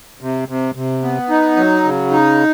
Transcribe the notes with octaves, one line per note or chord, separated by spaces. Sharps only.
C3
C3
C3
B3
D#4
F#3
C#3
D#4